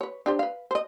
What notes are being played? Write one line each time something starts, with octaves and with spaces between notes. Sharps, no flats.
B4 C#5
D4 G4 C5
B4 F5
C5 D#5